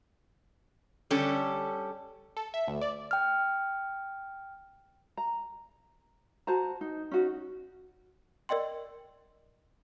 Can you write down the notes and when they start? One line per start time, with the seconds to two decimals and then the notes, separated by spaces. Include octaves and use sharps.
1.11 D3 G3 C#4 G4 A4
2.37 A4
2.54 E5
2.67 D2
2.81 D5
3.11 G5 F6
5.17 A#5
6.47 F#4 C5 A5 A#5
6.81 D#4
7.11 C#4 D#4 F#4
8.49 A#4 D5 D#5 G5 C6